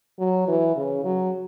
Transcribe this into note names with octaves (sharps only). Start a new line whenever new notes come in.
F#3
E3
C#3
F#3